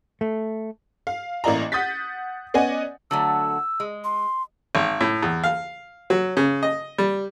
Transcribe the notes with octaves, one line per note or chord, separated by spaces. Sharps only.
A3
F5
A1 A#3 E4 D5 D#5 A#5
F#5 D#6 G6 A6 B6
B3 C#4 D5 D#5 F#5 G#5
D3 F#3 A3 E6
G#3
C6
G#1
A2
E2
F5
F#3
C#3
D#5
G3